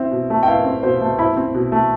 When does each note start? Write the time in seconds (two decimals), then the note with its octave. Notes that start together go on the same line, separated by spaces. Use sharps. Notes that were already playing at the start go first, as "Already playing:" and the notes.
Already playing: C4 E4 E5
0.11 B2
0.30 A3
0.43 G5
0.47 E4 F5
0.65 C4
0.83 B2 C5
1.01 A3
1.18 E4 B5
1.37 C4
1.55 B2
1.72 A3